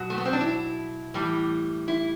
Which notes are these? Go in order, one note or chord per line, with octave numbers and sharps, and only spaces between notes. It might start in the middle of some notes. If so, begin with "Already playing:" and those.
Already playing: B2 F#3 F#4
A3
B3
C4
D4
E4
A2 E3 G3
E4